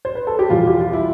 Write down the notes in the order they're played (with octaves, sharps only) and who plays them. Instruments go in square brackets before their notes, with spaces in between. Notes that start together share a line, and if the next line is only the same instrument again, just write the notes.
[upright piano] C5
B4
A4
G4
E2 B2 G3 F4
G4
F4
E4